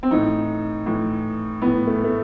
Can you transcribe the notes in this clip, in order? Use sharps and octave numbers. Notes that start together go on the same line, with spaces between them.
C4
A2 E3 D#4
A2 E3
A2 E3 B3
A3
A3